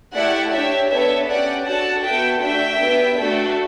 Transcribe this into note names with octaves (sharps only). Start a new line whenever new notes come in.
A3 E4 G4 D5 F#5
D4 G4 C#5 E5
B3 D4 A4 C#5 E5
C#4 G4 D5 F#5
D4 F#4 A4 F#5 A5
B3 F#4 A4 E5 G5
A3 D4 F#4 E5 G5
B3 D4 G4
A3 D4 F#4 A4